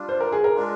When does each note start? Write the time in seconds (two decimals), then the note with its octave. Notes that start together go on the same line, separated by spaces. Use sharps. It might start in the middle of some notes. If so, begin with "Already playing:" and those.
Already playing: G3 D4 F4
0.09 C5
0.21 A#4
0.32 G#4
0.44 A#4
0.55 G#3 D4 F4